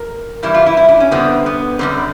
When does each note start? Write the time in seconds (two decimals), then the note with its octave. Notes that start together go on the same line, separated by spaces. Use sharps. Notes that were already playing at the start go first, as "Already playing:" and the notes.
Already playing: A#4
0.43 G2 E3 G3 E4
0.54 F4
0.66 E4
0.77 E4
0.89 D4
1.00 C#4
1.11 F2 D3 G3 B3 C4
1.46 B3
1.79 F#2 D3 G3 C4